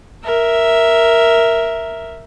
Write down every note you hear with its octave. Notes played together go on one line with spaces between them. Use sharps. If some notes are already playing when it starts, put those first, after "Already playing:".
A#4 E5